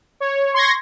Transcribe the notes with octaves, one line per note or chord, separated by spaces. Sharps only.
C#5
C6 C#6 G#6 A#6